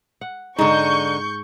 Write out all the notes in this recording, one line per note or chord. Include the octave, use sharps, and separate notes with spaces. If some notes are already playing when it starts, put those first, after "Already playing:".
F#5
G#2 D3 D#4 G5 C#6 G6